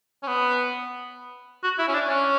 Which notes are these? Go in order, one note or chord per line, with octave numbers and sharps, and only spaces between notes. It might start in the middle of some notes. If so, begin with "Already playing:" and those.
C#4
B3
F#4
E4
C#4
D4
C#4